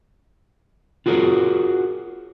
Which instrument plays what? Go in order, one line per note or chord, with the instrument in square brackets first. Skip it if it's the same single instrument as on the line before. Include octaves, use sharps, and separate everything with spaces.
[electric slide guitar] F4 F#4 G#4 A#4 C#5